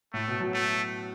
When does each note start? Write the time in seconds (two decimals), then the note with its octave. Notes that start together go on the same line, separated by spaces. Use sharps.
0.13 A2 A3
0.27 B2
0.40 F#3
0.54 A3